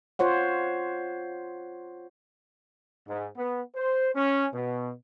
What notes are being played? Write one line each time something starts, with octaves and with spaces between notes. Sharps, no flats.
F4 C5 C#5 F#5
G#2
B3
C5
C#4
B2